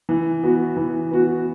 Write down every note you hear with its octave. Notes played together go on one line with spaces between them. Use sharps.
E3
B3 F#4
E3
B3 F#4